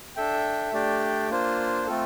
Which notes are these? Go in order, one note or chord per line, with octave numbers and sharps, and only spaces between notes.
D4 A4 E5 G5
A3 D4 G4 D5 G5
A#3 D4 F4 C5
A3 C4 F4 A4